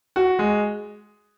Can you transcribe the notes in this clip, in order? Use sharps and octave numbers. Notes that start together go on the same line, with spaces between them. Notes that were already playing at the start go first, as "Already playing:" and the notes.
F#4
G#3